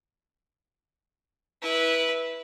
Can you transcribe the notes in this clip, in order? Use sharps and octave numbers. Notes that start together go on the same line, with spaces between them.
E4 B4